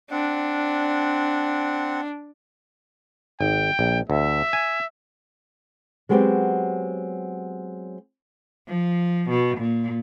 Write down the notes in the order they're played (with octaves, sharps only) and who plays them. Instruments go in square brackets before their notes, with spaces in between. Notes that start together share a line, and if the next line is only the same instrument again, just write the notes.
[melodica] C4 F#5 [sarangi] D4
[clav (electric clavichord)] G#1 [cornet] G5
[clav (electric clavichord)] A#1
[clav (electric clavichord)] D2 [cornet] E5
[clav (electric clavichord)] G#5
[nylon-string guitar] F#3 G#3 B3 C4 G4
[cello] F3
B2
A#2